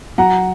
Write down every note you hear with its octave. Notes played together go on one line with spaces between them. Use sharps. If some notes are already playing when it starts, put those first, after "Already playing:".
F#3 F#5 A#5